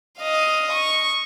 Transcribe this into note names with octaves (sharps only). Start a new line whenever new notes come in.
D#5 F5
C#6